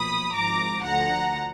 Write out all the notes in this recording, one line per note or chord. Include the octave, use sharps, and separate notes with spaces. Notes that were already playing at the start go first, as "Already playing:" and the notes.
Already playing: B1 A#2 F3 B5 D#6
G#1 G#2 F3 A#5 D6
D2 D3 F3 F#5 A#5